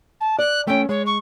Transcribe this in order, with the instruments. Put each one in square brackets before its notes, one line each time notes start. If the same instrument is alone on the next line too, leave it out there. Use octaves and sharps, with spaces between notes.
[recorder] A5
[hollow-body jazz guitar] D5 [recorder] F#6
[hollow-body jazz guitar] A3 C#4 [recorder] G5
[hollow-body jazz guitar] G#3 [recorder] C#5
[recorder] C#6